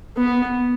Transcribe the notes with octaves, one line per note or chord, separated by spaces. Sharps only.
B3